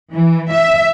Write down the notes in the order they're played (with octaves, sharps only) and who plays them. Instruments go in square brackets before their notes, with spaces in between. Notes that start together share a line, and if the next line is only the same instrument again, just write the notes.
[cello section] E3
E5